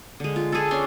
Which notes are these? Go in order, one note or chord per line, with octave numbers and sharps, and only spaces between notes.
D3 G#3
F4
G#4 A4
C#4 D4 C6